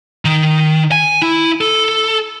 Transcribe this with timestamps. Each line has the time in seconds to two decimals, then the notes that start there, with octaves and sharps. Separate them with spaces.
0.25 D#3
0.92 G#5
1.22 E4
1.61 A4